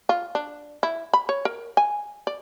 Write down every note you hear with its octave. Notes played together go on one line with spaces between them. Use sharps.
F4
D4
E4
B5
C#5
A#4
G#5
D5